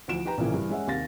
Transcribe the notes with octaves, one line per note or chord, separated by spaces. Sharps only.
D2 E3 F3 D7 E7
D#4 G4 B4 G5 A#5
A#1 A#2 C#3 E3 A#3 G#5
G2 E3
G#3 C#4 E5 F#5
D#2 C3 F5 A6 A#6